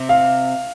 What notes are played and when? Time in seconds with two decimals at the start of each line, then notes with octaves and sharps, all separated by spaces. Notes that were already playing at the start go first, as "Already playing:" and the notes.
Already playing: C3
0.09 F5